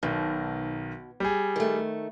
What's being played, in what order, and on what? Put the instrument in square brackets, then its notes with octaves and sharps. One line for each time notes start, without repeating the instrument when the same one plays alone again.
[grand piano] B1 D#3 [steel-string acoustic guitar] B2
[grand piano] G3 G#4
[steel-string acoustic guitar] D#3 A3